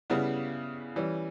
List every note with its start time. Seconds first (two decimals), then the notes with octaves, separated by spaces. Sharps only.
0.10 C#3 G3 B3 E4
0.96 E3 G3 C#4